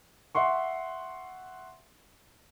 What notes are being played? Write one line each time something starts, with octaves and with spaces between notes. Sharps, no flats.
E5 F#5 C6 C#6